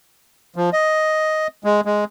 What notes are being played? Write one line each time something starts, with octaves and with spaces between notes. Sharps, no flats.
F3
D#5
G#3
G#3